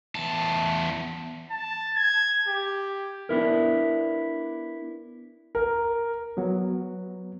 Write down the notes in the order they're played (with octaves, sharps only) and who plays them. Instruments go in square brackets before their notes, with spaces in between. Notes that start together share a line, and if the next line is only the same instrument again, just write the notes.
[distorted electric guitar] E2 A5
[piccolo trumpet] A5
G#6
G4
[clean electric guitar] B3 D4 E4 A#4
[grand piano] A#4
[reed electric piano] F#3 B3